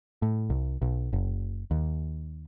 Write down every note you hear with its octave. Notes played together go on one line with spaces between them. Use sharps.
A2
C2
B1
F#1
D#2